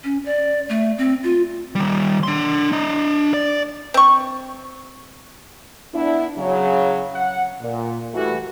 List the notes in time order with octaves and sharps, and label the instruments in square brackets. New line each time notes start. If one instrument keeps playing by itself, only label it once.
[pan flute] C#4
D5
A3
C4
F4
[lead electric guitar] D#3 G3
D4 C6
D4 D#5
D5
[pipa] C4 C#6
[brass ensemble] B3 D4 E4
C#3 F#3
F#5
A#2
E3 G3 A3 F#4